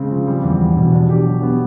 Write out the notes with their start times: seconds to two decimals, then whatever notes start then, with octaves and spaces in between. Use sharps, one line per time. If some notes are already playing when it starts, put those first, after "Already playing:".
Already playing: C#3 G#3 C4
0.11 F3
0.27 G3
0.43 E2
0.60 E2
0.76 B2
0.93 D4
1.09 G4
1.26 F#3
1.43 B3